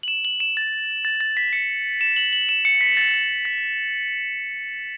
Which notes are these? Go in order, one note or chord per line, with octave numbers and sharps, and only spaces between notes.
F#7
E7
F#7
E7
A6
A6
A6
B6
C#7
E7
F#7
F#7
E7
C#7
B6
A6
B6